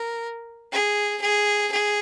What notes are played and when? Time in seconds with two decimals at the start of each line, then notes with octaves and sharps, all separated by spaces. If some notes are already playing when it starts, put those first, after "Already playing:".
Already playing: A#4
0.72 G#4
1.21 G#4
1.71 G#4